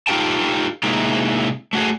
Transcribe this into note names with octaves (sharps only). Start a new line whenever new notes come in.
D#4 F4 G4 A4 G5 A5
C3 G#3 A#3 D#4 E4 F#4
A3 F#4 G#4